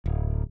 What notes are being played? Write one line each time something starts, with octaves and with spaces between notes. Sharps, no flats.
D1